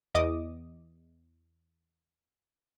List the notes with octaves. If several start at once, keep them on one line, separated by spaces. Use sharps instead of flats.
E2 D#5 D6 D#6